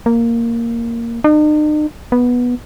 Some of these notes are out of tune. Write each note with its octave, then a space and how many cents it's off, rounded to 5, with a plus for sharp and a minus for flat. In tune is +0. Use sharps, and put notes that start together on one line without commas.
A#3 -5
D#4 -45
B3 -10